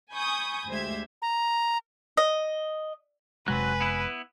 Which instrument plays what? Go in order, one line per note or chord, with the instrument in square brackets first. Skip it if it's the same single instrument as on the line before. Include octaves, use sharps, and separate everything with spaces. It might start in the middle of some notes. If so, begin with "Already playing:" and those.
[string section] G#5 B5 C#6 D#6 G6
D2 G#3 G4 C5 E5 G#6
[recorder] A#5
[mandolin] D#5
[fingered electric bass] F1 C3 G#3 [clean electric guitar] F#3 C4 [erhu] B4 [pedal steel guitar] G#5 F#6
[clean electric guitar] B3 E4